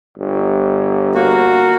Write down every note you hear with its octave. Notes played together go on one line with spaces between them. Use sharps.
G1
A#3 F#4